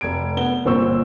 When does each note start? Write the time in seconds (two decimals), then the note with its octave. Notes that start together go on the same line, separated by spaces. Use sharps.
0.01 F1 G#6 D7
0.37 B3 G7
0.65 G1 A#2 C4 C#6 E6